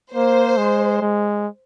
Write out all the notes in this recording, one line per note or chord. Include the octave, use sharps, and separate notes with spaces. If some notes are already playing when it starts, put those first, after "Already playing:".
A#3 C5
G#3
G#3